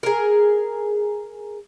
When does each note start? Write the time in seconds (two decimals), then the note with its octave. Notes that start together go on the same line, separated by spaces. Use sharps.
0.03 G#4 A#4